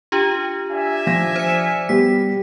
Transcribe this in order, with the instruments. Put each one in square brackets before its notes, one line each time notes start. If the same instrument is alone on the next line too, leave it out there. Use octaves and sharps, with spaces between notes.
[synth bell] D4 F4 G4
[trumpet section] D5 E5 G#5
[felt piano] F3 A#6
[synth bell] C5 C#7
[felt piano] G3 B3 G4 [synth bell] B6